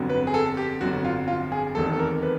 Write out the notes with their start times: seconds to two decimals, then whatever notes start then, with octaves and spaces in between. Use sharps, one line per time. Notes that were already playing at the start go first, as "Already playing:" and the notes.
Already playing: G1 F2 D3 F#3
0.09 B4
0.27 G#4
0.34 A4
0.57 G4
0.81 G1 F2 D3 F#3 F#4
1.04 F4
1.28 F4
1.52 G#4
1.75 F1 E2 C3 D#3 A4
1.93 A4
1.99 A#4
2.23 B4